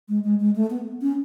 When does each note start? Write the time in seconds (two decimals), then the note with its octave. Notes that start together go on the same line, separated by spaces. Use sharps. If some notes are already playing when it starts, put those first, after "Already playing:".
0.09 G#3
0.24 G#3
0.40 G#3
0.56 A3
0.70 B3
1.02 C#4